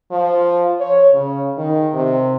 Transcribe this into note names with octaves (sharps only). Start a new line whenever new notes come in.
F3
C#5
C#3
D#3
C3